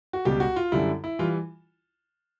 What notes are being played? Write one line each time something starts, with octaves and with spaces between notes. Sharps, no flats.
F#4
C#2 B2 G3 G4
F#4
F4
F#2 D3 G3 E4
E4
E3 G3 F4